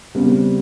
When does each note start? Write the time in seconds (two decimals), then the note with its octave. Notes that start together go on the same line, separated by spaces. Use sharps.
0.15 E2 C#3 G3 C4